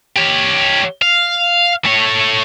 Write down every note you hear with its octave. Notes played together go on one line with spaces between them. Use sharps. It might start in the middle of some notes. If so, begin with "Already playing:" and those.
G4 C#5
F5
A3 C#5